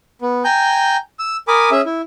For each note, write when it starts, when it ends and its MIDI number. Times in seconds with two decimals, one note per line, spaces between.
0.22 0.43 59
0.45 0.97 79
0.45 0.97 80
0.45 0.97 82
0.45 0.97 91
1.19 1.37 88
1.48 1.70 70
1.48 1.70 80
1.48 1.70 83
1.48 1.70 86
1.48 1.70 87
1.71 1.81 61
1.71 1.81 68
1.71 1.81 76
1.86 2.01 64